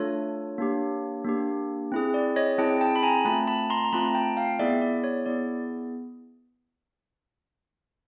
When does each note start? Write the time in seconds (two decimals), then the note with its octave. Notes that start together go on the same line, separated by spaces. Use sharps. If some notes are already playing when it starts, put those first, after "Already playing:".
Already playing: A3 D4 F4 A4 C#5
0.58 A#3 D4 G4
1.25 A#3 D4 G4
1.92 C4 E4 G#4
2.14 D5
2.36 C#5 D#5
2.58 C4 E4 G#4 G5 A5
2.81 G5 A5
2.96 B5
3.03 G#5 A#5
3.25 A3 C4 F4 A5 B5
3.47 A5 B5
3.70 A#5 C6
3.85 A#5
3.92 A3 C4 F4 A5 B5
4.05 A#5
4.15 G5 A5
4.37 F5 G5
4.59 B3 E4 G#4 D5 E5
4.82 D5
5.04 C#5
5.26 B3 E4 G#4 D5